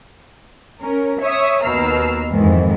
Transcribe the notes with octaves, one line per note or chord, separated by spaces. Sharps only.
C#4 A#4
C#5 E5 C#6 D#6 E6
D#2 B2 A#5 E6 F6 C7
F2 G#2 D#3 E3